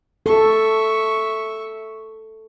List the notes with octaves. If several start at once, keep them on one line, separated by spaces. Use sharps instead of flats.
A4 E5 C#6